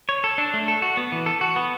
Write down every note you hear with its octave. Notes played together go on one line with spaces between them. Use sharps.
C#5
A4
D4
A3
A4
F#4
B3
E3
A4
F#4
B3